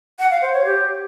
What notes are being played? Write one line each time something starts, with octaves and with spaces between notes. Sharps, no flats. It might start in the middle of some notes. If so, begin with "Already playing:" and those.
F#5
F5
C5
C#5
G4